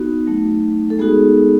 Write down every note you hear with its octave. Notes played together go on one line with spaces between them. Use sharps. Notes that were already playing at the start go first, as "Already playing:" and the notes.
Already playing: B3 D#4 F#4
F#3 A3 D#4
A4
G#3 B3 D#4 F#4 G#4